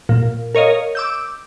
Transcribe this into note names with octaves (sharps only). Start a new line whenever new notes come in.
A#2
A#4 C#5 D#5 F5
D6 E6 G6